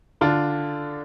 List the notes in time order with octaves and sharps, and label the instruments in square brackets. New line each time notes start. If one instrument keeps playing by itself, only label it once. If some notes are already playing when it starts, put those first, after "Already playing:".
[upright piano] D3 [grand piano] D4 F4